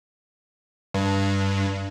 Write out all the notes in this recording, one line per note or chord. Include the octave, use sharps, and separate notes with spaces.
G2